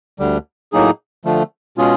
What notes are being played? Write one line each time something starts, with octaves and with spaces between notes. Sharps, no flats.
D2 D3 G3
A2 F#3 A#3 D#4 G#4
D3 F3 A3
B2 G#3 C#4 F4 G#4